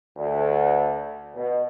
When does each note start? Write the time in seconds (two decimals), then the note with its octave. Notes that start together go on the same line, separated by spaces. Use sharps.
0.17 D2
1.37 B2